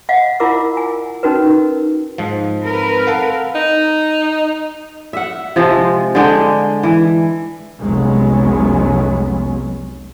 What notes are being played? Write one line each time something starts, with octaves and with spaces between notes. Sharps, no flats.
D#5 F5 F#5
E4 F4 A#4 F#5 D6 E6
G#5
C#4 D#4 F#4 A#4 B4
G#2 F3
C4 A#4 B4
A4 F5 F#5
D#4
E5 F#5
C3 F3 G#3
D3 G#3 G5
E3
F1 C2 F#3 G#3 B3 C#4